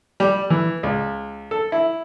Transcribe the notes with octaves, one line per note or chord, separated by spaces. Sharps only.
G3
E3
C#2
A4
E4